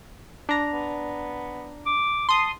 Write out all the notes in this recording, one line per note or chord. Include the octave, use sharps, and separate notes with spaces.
D4 A#5
B3
D6
A5 C6 D#6